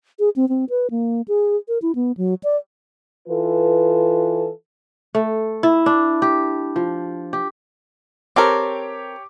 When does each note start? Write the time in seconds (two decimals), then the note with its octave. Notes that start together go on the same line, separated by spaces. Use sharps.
0.19 G#4
0.36 C4
0.49 C4
0.70 B4
0.91 A#3
1.28 G#4
1.68 A#4
1.82 E4
1.95 B3
2.17 F#3
2.44 D5
3.28 E3 F4 A4 B4
5.15 A3
5.63 E4
5.86 D4
6.22 G4
6.76 F3
7.33 G4
8.36 C4 G4 A4 A#4 C#5 D6